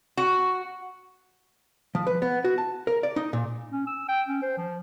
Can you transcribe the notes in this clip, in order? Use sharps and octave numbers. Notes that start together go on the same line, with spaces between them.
F#4
F3
B4
B3
F#4
A5
A#4
D5
D#4
A#2
C#4
E6
G5
C#4
C5
F3